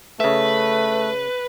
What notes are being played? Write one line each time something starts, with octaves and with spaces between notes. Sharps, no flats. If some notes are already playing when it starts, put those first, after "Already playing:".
C#3 A3 B4 E5